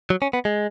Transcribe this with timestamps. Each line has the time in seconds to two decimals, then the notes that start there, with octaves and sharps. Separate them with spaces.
0.10 F#3
0.22 C#4
0.33 B3
0.45 G#3